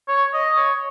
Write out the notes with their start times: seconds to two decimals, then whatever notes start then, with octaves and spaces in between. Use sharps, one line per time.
0.08 C#5
0.34 D#5
0.57 C#5